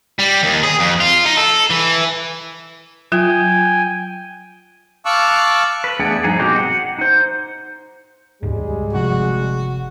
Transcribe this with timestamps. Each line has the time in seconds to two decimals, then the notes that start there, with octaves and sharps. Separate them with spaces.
0.19 G3
0.43 D#2
0.63 G#4
0.79 F2
1.00 F4
1.25 D#4
1.37 A4
1.70 E3
3.12 F#3 F4 G5 G#5
5.05 F5 A5 C#6 D6 E6 F#6
5.84 B4
5.99 E2 A3 D4 G#4 D5 F#5
6.24 G2 F3 D#4 G#4
6.39 B2 A#3 C4 D#4 F#4 G4
6.56 F#5
6.98 D#4 C5
8.43 D#1 C#2 G#2 G3 G#3 G#4
8.93 G1 C3 F3 F#4